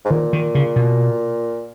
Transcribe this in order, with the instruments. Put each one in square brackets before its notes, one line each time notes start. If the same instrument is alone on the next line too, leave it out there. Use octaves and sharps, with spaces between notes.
[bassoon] G#2
[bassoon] A#2 [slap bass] D#3
[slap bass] D#3
C#3
B2